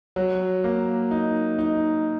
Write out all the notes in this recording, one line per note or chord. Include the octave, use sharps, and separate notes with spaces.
F#3
A#3
D#4
D#4